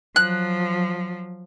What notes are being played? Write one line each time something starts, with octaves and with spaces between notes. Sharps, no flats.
F3 F#3 F#6